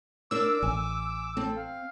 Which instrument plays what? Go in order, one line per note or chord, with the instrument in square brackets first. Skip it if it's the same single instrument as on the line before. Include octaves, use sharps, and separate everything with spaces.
[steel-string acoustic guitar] D4 A#4 [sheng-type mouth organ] D6 [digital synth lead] E6
[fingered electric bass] A1 [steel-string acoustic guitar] G#5
[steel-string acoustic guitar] C4 [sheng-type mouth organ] A4
[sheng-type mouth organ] F5